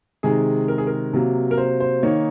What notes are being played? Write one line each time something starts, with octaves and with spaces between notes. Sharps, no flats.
C3 D#3 G#3 G#4
A#4
G#4
A#4
C3 F#3 A#3
A#4
C5
C5
D#3 A#3 D#4 C#5